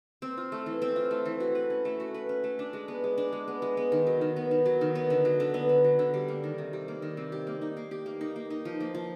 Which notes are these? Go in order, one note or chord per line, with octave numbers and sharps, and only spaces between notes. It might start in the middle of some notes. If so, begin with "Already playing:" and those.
C4
F4
A3
E3
C4
F4
A3
E3
F#4
B4
C#4
A3
F#4
B4
C#4
A3
D4
G#3
B3
G#3
D4
G#3
B3
G#3
B3
D#3
F#3
D#3
B3
D#3
F#3
D#3
B3
D3
F#3
D3
B3
D3
F#3
D3
G3
A#3
D#3
C3
G3
A#3
D#3
C3
G4
A#3
D#4
A#3
G4
A#3
D#4
A#3
D#4
F3
A#3
F3